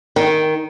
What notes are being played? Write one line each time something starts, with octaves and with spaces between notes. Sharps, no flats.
D#3